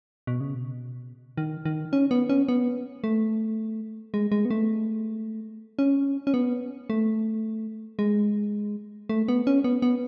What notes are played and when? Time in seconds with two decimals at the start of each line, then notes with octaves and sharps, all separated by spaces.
0.27 B2
0.40 C#3
0.54 B2
1.37 D#3
1.65 D#3
1.93 C#4
2.11 B3
2.29 C#4
2.48 B3
3.04 A3
4.14 G#3
4.32 G#3
4.45 B3
4.51 A3
5.79 C#4
6.27 C#4
6.34 B3
6.90 A3
7.99 G#3
9.09 A3
9.28 B3
9.47 C#4
9.64 B3
9.82 B3